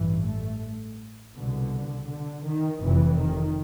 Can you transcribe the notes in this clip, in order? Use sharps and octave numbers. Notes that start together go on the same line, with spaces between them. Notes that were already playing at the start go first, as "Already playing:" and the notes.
Already playing: A1 G2 E3
A3
C2 B2 D3
D3
D#3
F1 F2 C3 E3
D#3